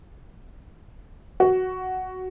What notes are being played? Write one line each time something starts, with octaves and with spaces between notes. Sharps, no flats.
F#4